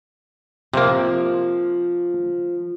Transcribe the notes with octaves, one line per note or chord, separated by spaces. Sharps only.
C3 F3 A#3